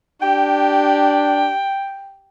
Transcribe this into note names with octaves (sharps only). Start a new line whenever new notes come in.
D4 G4 G5